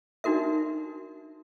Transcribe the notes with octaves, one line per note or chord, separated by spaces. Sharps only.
D4 D#4 F#4 A#4 E5